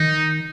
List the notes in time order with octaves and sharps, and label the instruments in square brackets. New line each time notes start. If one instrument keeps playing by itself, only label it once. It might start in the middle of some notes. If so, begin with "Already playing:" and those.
Already playing: [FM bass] D#3 [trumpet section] D#4